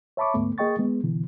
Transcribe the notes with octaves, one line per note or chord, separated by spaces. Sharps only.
C#5 E5 A5 B5 C#6 D6
D2 G#2 A3 B3
A#3 G#4 D#5 G5 C#6 A6
G#3 B3
B2 D3 E3